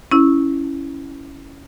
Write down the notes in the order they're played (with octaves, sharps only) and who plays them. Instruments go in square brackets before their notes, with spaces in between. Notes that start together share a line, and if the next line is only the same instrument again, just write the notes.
[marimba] C#4 E4